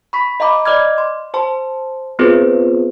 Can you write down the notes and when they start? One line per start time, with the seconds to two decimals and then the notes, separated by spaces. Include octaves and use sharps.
0.13 B5 C#6 B6
0.40 D#5 F5 A#5 B5 D6
0.65 D5 D#5 D6 F6 G#6
0.98 C6
1.34 C5 A5 C6
2.19 B3 C4 F4 G#4 B4 C5